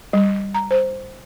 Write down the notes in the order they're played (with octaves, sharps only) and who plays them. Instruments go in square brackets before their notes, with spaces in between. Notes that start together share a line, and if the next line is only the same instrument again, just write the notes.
[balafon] G3
A#5
C5